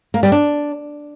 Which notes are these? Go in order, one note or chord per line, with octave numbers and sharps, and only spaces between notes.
A#3
G3
D4